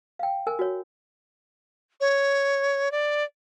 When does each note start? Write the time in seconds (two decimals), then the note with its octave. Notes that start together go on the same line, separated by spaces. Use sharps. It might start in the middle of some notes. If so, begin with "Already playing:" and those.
0.19 F5 G5
0.47 A#4 G#5
0.59 F#4 C#5
2.01 C#5
2.92 D5